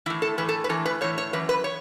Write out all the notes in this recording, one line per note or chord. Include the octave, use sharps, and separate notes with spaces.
A2 E3 E4
A4
A2 E3 B4
A4
B4
A2 E3 A4
B4
A2 E3 C#5
C#5
F#2 E3 B4
B4
C#5